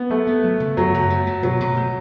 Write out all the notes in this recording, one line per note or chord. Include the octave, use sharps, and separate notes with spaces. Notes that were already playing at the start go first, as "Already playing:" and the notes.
Already playing: B3
F#3 A3
B3
F#3
C#3
F#2 F#3
F#2
A3
A3
B2 F#3
B2
A3